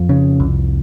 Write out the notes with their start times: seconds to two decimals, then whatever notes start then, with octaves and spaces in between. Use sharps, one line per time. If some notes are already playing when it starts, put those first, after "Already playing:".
Already playing: F2 F3
0.09 C#3
0.40 C2